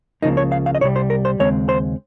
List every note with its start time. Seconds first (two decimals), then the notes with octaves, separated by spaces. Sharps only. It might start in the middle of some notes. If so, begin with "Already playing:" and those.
0.22 C#2 C#3 F3 A#3 D#4
0.37 C#5
0.52 F5
0.66 F5
0.75 D#5
0.81 C2 C3 G3 C#5
0.96 C5
1.10 A#4
1.25 C5
1.39 D#2 C#3 G#3 C4 C#5
1.69 C5